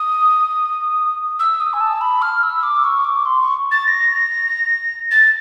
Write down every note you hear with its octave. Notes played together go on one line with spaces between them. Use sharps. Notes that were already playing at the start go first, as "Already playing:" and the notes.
Already playing: D#6
E6
D#6
G#5
A5
B5
F6
E6
D6
C#6
D6
C6
C#6
A6
A#6
A6